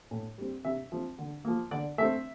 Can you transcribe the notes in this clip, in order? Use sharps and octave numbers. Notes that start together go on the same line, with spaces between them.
A2
G3 C4
C3 E5
F3 C4
D3
F3 A#3
D3 D5
A3 C4 E5